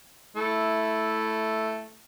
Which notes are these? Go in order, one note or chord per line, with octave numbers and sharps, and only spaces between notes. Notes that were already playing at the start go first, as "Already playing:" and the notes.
A3 E4